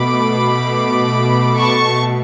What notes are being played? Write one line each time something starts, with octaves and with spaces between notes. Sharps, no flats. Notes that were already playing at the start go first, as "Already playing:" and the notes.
Already playing: B2 A3 B5 D6
A5 C#6